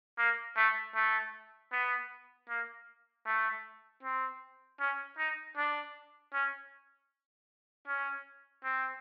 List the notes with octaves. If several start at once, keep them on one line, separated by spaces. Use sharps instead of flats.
A#3
A3
A3
B3
A#3
A3
C4
C#4
D#4
D4
C#4
C#4
C4